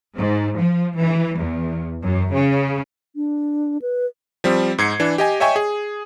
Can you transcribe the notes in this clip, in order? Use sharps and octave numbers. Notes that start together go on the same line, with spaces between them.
G#2
F3
E3
E2
F#2
C#3
D4
B4
F3 G3 C4
G#2 G#6 C7 C#7
E3 D4
G4 D#5 G#5
C#5 D#5 E5 G5 G#5 C#6
G#4